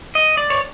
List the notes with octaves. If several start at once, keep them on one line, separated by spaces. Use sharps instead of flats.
D#5
D5
C#5